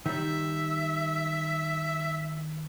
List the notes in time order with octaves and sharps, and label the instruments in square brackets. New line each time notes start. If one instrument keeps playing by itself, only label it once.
[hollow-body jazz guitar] D#3 G3 [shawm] E5